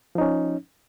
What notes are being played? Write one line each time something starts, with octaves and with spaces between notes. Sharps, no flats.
F3 C#4 D#4